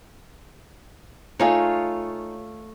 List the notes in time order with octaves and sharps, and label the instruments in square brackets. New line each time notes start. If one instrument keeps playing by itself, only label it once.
[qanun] A3 F4 C#5 [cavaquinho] D#4 G#4